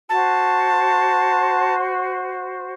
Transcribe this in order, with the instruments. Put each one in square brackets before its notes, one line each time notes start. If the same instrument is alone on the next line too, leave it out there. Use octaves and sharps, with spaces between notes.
[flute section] F#4 C5 [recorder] A5